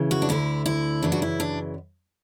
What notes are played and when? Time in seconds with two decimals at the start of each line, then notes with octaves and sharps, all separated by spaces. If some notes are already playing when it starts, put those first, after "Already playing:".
Already playing: C#3 E3
0.11 F#4
0.22 D4
0.29 D2 D3 E4
0.66 E4
1.02 F#2 C#3 E3 D4
1.12 F#4
1.22 E4
1.40 D4